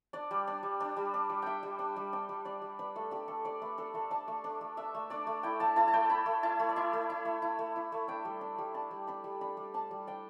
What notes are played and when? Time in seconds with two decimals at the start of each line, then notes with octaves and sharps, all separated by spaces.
0.13 D4 D5
0.31 G3
0.47 D4
0.63 G3
0.80 D4
0.97 G3
1.14 D4
1.30 G3
1.42 D4 E5 G5
1.63 G3
1.79 D4
1.96 G3
2.13 D4 G5
2.29 G3
2.45 D4 D5
2.62 G3
2.79 D4 B4
2.96 A3 A4
3.11 D4 G4
3.28 A3 A4
3.45 D4 D5
3.62 A3 B4
3.78 D4 A4
3.94 A3 A4
4.11 D4 A5
4.28 A3
4.44 D4
4.61 A3
4.77 D4 E5
4.94 A3
5.10 D4 D5
5.27 A3
5.43 E4 G5
5.60 A3 A5
5.76 E4 A5
5.88 A5
5.93 A3 G5
6.09 E4 B5
6.26 A3
6.43 E4 A5
6.59 A3
6.69 D5
6.76 E4 E5
6.93 A3
7.10 E4
7.25 A3
7.42 E4
7.59 A3
7.76 E4
7.92 A3
8.08 D4 G5
8.25 G3
8.41 D4
8.58 G3
8.74 D4 A5
8.91 G3
9.07 D4 B5
9.24 G3
9.41 D4 B5
9.57 G3
9.74 D4 A5
9.91 G3
10.07 D4 G5